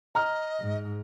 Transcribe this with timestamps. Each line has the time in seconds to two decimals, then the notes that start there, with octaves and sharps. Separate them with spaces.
0.15 D#5 A#5 F6
0.60 G#2